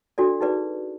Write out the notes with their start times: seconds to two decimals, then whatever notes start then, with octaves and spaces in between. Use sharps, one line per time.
0.18 D4 F#4 A4 D5
0.41 D#4 G#4 B4 D5